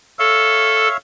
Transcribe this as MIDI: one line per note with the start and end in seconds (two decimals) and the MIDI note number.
0.19 0.88 69
0.19 0.97 73
0.19 0.97 76
0.19 0.97 77